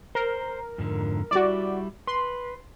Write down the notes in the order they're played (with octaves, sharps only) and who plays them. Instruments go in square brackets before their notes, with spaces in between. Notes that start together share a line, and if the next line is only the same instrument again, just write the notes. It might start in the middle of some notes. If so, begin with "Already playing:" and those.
[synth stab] A#4 [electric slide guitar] C5
[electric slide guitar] F2 G#2 D3
[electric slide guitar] G3 E4 [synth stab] F#4 D5
[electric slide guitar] B4 [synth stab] C6